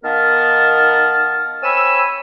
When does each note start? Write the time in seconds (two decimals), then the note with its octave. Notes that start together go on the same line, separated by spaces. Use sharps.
0.04 D#3 B3 A#4 F5 A5 F6
1.63 C4 C#5 G#5 B5 E6